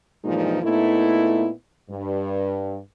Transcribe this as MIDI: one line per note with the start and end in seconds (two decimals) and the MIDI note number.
0.24 0.59 43
0.24 0.59 46
0.24 0.59 52
0.24 0.59 53
0.24 0.59 56
0.24 0.59 63
0.63 1.49 46
0.63 1.49 57
0.63 1.49 59
0.63 1.49 63
0.63 1.49 64
1.90 2.78 43